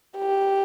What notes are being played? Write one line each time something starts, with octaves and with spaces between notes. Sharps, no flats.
G4